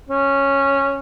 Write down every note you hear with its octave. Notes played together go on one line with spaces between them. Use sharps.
C#4